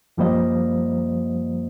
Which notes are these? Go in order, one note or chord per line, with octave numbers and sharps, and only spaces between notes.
F#2 F3 G3 A#3 C5 D#5